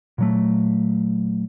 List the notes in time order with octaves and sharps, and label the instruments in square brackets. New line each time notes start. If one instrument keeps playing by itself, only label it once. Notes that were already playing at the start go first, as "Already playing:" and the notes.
[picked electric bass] A#2 F#3 A3